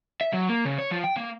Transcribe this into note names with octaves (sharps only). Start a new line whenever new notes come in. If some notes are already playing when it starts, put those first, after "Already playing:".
E5
F#3
A#3
C#3
C#5
F3
G5
A#3